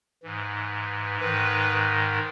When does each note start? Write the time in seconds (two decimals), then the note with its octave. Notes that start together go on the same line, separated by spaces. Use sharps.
0.23 G#2 E3
1.20 G#2 D#3 B4